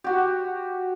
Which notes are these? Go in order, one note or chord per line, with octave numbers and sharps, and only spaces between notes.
F#4 G4